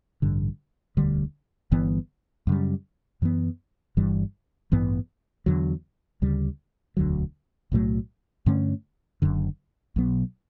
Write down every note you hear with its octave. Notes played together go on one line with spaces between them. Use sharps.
A1 G2 D3 G3
E1 D2 D3 G3
G1 G2 E3 B3
F#2 C#3 G3
F#2 E3 B3
G1 G2 E3 G3
A1 G2 E3 B3
E2 D3 F#3
D2 C#3 G3
E1 D2 D3 F#3
B1 A2 F#3 A3
G2 D3 A3 C#4
F#1 F#2 D3
B1 B2 F#3 B3